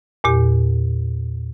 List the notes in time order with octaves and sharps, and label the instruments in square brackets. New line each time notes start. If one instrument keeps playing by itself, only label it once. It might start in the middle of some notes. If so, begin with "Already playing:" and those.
[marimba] E2 A#2 G4